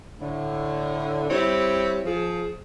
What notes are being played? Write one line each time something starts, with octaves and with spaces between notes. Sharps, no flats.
A2 D3
G3 C4 E4 C#5
F3 G#4